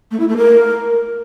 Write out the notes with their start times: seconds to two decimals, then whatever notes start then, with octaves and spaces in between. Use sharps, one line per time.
0.11 A3
0.20 E4
0.28 A3
0.37 A#4